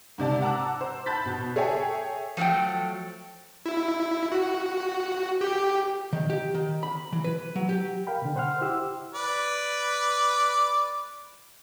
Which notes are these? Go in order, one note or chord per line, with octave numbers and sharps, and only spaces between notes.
G#2 C3 D5 A5
F#5 A5 A#5 D6 E6 F#6
C5
A5 B5 F#6 G6 A6 B6
B2
G#4 A4 C#5 E5 G5 G#5
F3 F#3 A3 A4 G5
E4
F#4
G4
D#3
G4
D#3
B5
E3
B4
F#3
G4
A#4 F5 G5 B5
B2 D3
C5 F#5 C6 F6
E4 G4 E6
B4 D5